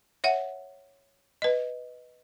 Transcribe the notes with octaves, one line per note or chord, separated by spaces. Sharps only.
C#5 E5 F#5
B4 D#5